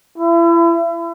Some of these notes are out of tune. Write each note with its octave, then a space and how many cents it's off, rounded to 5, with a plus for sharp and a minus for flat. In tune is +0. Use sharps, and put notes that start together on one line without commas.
E4 +35